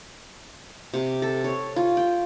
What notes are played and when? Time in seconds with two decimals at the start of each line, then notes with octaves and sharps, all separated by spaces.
0.94 C3
1.22 A4
1.44 C#5
1.76 F4
1.97 G5